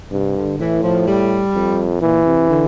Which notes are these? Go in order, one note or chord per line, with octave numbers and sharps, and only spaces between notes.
G2 C3
D3
A2 E3
F3
G3
F2
A#2 E3
C3
D3